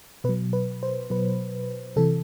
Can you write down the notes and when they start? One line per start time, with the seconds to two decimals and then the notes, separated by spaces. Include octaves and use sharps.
0.24 B2 B4
0.29 F#3
0.53 B4
0.83 C5
1.10 B2 F#3 B4
1.96 C3 E3 A4